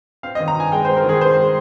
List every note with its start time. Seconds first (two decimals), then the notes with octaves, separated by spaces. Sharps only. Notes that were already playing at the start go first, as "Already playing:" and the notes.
0.23 C4 F5
0.35 D#5
0.40 D#3
0.48 A#5
0.56 G2 G#5
0.72 G#3 G5
0.85 C5
0.89 C4
0.97 A#4
1.05 D#3 G#4
1.21 G2 C5
1.38 G#3